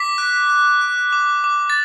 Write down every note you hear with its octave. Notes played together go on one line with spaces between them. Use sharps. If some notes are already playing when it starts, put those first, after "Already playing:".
Already playing: D6 B6
F#6
F#6
F#6
D6
D6
A6